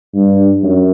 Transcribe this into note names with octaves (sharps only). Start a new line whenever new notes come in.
G2
F#2